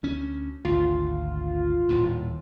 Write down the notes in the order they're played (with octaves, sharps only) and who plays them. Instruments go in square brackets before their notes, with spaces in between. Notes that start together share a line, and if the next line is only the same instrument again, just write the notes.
[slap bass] D2 C#4
[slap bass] G#1 D2 [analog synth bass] F4
[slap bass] D#1 D#2 A2